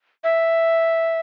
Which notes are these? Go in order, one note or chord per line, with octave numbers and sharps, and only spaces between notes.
E5